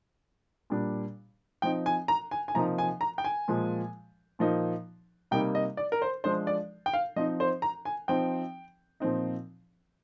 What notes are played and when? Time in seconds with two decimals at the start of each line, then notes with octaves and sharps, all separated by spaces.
0.70 A#2 G3 D4
1.62 F3 C4 D#4 G5
1.86 G#5
2.08 A#5
2.31 G#5
2.48 G#5
2.54 C3 F3 A#3 D#4 A#5
2.78 G#5
3.01 A#5
3.18 G5
3.24 G#5
3.48 A#2 F3 G#3
4.39 A#2 F3 A#3 D#4
5.31 C3 G3 A#3 D#4 G5
5.55 D#5
5.77 D5
5.92 A#4
6.02 C5
6.24 F3 G#3 D4 C5
6.47 D5
6.86 G5
6.93 F5
7.16 F3 C4 D#4 D#5
7.40 C5
7.62 A#5
7.85 G#5
8.08 F3 C4 D#4 G5
9.00 A#2 F3 C4 D#4